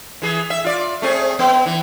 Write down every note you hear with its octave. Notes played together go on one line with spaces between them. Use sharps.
E3 G#4
E5
F4 D5
A3 C4 G#4
B3
E3